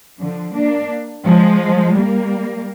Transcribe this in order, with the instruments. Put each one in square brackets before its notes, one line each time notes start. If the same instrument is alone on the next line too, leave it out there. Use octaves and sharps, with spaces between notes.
[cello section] D3 F3
A#3 D4
F3 G#3
G3 A#3